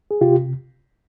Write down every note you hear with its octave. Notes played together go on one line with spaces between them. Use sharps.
G#4
C3 F4 G4